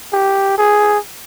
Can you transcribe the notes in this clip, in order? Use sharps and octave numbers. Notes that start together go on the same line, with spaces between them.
G4
G#4